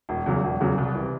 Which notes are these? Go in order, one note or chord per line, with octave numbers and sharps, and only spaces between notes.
E1
E2 C#3 F#3
E1
E2 C#3 F#3
C2
C3 E3